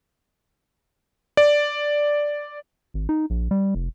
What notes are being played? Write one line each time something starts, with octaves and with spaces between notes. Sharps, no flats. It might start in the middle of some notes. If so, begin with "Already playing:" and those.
D5
G#1
D#4
A#1
G3
F1